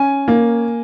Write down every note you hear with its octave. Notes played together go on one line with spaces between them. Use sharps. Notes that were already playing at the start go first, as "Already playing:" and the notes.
Already playing: C#4 G#5
A#3